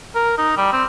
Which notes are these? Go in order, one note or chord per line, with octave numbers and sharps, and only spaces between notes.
A#4
D#4
G3
C4